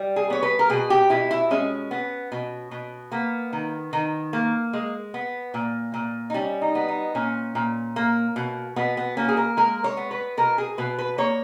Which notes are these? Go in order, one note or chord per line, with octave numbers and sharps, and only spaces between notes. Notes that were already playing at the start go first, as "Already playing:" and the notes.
Already playing: G3
G#4
B3 C#5
B4
A#4
B2 G#4
G4
B2 E4
E4
G#3 C#4
B3
B2
B2
A#3 B3
D#3
D#3
A#3
G#3
B3
A#2
A#2
D#4
G3 C#4
D#4
B3
D#4
A#2 C#4
A#2
A#3
B2
B2 B3
B3
A#3 C#4
G#4
A#4
G#3 A#4
C#5
B3
B4
B2 A#4
G#4
B2 B4
B4
A#3 C#5